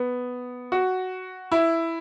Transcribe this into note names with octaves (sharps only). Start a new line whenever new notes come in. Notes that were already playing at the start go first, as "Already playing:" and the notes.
Already playing: B3
F#4
E4